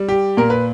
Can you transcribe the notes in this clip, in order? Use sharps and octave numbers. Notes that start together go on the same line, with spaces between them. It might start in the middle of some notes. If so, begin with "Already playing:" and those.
Already playing: G3
G4
A#2 A#4
B4